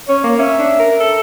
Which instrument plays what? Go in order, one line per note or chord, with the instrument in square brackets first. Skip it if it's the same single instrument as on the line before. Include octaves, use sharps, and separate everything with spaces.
[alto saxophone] C#4 [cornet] C#5
[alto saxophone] A#3
[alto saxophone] C#4 [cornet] E5
[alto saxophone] D4
A#4
A4